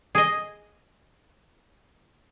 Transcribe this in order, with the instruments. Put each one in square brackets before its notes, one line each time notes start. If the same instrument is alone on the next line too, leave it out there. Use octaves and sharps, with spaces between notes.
[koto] G#4 D#5